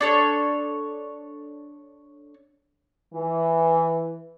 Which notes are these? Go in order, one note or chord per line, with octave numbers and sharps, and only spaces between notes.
D4 A4 C#5
E3